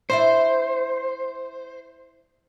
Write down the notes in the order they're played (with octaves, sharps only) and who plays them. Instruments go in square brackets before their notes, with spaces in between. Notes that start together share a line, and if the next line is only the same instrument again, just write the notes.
[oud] E4 D5 E5 [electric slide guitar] C5